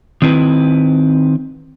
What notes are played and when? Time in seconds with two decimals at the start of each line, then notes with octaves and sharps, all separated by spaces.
0.22 D#3 C4 E4 B4